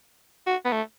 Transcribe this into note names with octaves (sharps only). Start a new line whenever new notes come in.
F#4
B3
A3